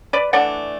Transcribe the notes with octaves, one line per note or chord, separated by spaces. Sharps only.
B4 D5
E3 A3 D4 D5 F#5